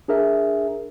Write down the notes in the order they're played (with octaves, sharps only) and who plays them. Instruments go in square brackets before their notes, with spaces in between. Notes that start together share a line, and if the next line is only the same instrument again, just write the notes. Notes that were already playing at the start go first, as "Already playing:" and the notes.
[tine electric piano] D4 G#4 A#4 E5